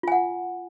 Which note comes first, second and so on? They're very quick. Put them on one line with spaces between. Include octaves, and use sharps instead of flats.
F4 G#5 F#5